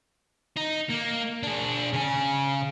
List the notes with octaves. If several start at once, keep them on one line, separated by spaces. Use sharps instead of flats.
D#4
A#3
D4 G#4
C#3 G#5